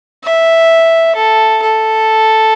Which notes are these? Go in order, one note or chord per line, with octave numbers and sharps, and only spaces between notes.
E5
A4
A4